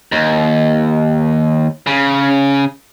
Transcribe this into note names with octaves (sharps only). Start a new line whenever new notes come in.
D#2
C#3